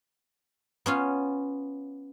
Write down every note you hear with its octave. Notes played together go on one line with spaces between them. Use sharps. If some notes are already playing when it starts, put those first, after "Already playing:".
B3 C#4 F4